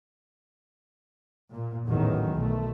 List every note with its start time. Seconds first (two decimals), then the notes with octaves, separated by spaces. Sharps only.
1.51 A#2
1.87 A1 E2 D#3 F#3
2.34 B1 A3